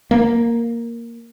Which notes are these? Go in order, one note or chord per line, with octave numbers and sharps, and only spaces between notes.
A#3